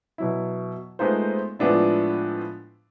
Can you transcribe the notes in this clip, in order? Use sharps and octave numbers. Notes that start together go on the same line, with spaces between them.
B2 F#3 E4
G#3 A3 B3 D#4 F4 C5
A2 F3 G#3 B3 D4 E4